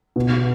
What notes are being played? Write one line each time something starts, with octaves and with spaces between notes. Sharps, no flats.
B2